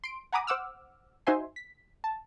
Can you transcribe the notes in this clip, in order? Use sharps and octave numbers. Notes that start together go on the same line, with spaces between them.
C6 D7
F#5 G#5 A#5 B5 D6 D#6
C5 F#5 D6 E6 F6
D#4 F#4 C5 E5 G#5 C6
B6
A5